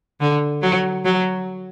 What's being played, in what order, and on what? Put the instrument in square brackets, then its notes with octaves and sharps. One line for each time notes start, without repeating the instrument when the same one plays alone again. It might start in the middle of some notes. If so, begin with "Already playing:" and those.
[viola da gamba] D3
F#3
F#3